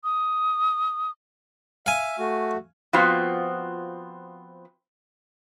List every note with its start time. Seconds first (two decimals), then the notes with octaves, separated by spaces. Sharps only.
0.04 D#6
1.86 E5 F5 G#5
2.18 A3 F#4
2.93 F3 B3 C4 F4 F#4